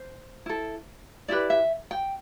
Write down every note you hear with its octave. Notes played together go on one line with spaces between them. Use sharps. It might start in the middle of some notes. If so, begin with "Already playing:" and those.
Already playing: C5
E4 A4
E4 G4 B4 D5
E5
G5